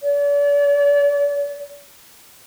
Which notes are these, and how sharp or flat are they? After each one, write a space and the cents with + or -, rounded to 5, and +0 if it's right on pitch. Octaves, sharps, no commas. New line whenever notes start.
D5 -40